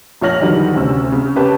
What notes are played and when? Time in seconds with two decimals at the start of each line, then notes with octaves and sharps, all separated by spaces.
0.21 A#1 F4 C#5 F6 A#6 F#7
0.41 E2 D3 D#3 F#3 G3
0.74 D2 C3 C#4 E6
1.12 C#3
1.36 C#4 G4 B4 A5